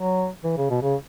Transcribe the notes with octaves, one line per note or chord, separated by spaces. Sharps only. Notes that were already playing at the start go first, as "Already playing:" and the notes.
Already playing: F#3
E3
C#3
B2
C#3